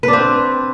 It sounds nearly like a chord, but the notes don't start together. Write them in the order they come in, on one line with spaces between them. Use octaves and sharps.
B4 D4 C4